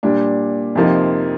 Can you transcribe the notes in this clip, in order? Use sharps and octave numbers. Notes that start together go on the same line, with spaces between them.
A#2 G3 D4
F2 C3 F3 A#3 D#4